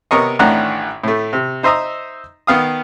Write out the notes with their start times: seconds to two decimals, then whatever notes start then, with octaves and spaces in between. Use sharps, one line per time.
0.11 C3 B3 A#4 C#5 D#5
0.39 A1 A2 D#3 D4 F#5 A#5
1.04 A2 A3
1.33 C3
1.63 D#4 C5 E5 A#5 D#6
2.47 D#3 B3 F5 D#6